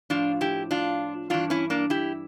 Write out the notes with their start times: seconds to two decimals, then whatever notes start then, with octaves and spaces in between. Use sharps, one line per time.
0.10 A2 F3 D4 F4
0.41 E4 G4
0.71 D4 F4
1.30 G2 E3 D4 F4
1.50 C#4 E4
1.70 A#3 D4
1.90 E4 G4